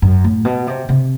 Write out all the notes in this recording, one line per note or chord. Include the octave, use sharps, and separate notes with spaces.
F#2
A2
B2
C3
C3